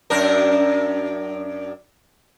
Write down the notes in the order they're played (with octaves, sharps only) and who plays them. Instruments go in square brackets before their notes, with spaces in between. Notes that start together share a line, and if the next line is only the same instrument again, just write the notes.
[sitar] F#2 D4 A#4